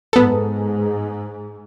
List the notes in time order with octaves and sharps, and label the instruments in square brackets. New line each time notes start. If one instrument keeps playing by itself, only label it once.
[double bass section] G#2 [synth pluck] B3 A4